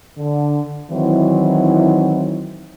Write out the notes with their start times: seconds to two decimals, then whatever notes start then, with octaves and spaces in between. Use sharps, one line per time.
0.19 D3
0.90 D#3 E3 F#3 C4 D#4 E4